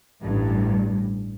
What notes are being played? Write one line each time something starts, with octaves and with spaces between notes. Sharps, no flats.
A1 G2